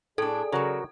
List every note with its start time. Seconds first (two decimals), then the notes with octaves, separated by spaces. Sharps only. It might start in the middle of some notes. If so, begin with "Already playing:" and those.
0.18 A2 D4 G#4 A4 D5
0.52 C#3 F#3 F#4 A#4 C#5